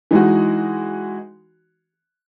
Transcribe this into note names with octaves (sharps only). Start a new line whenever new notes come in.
E3 G#3 D#4 F#4